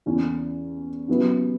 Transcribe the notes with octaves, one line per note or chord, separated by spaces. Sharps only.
E2 C#3 E3 C#4
C#3 F#3 B3 E4 B4